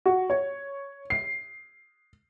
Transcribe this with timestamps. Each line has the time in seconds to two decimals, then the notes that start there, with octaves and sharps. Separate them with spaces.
0.06 F#4
0.30 C#5
1.10 C7